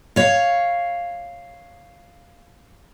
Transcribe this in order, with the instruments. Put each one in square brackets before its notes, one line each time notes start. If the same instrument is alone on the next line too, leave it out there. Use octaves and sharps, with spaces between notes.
[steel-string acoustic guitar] C#5 F5